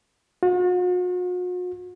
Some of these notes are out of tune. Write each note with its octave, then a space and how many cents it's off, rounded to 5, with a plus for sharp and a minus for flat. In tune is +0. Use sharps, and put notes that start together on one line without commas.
F#4 -45